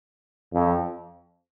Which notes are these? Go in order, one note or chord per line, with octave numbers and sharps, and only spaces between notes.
F2